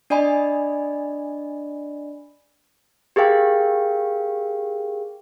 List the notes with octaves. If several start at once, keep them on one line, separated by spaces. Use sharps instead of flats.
D4 D5 D#5 G#5 B5
G4 G#4 A#4 F5 G5